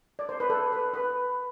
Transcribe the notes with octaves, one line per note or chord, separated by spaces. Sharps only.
D5
C5
B4
A4
B4
B4